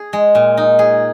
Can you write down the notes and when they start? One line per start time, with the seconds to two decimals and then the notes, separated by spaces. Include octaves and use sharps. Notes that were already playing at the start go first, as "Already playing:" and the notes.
Already playing: G#4
0.13 G#3
0.35 A#2
0.57 D#4
0.79 G#4